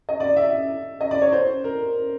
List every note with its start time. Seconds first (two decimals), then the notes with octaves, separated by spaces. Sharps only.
0.09 D#5
0.20 D5
0.36 E5
1.01 D#5
1.11 D5
1.22 C#5
1.32 C5
1.64 A#4